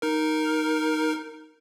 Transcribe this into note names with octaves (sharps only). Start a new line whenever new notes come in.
D#4 A#4